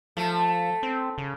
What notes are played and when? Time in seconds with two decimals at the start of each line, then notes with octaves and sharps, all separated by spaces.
0.17 F3 A3
0.83 C4
1.18 C#3